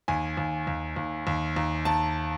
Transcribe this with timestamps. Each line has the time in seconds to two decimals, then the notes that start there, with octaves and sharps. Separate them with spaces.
0.08 D#2 G#5
0.37 D#2
0.67 D#2
0.96 D#2
1.27 D#2
1.56 D#2
1.85 D#2 A5